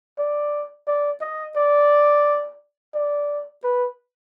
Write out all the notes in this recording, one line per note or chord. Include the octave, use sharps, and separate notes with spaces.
D5
D5
D#5
D5
D5
B4